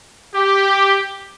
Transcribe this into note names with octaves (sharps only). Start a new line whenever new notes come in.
G4